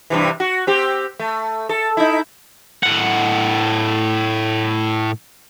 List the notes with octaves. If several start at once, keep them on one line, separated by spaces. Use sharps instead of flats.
G2 C3 E3
F#4
C4 G4
A3
A4
D#4 E4
A2 F#5